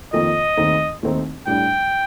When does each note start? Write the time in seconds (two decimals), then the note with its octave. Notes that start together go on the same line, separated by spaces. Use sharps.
0.13 F2 D#3 A#3 F4 A4 D#5
0.57 D#2 D#3 A3 C4 D#4
1.03 D#2 D#3 A3 C4 D#4
1.47 A2 G3 D4 G5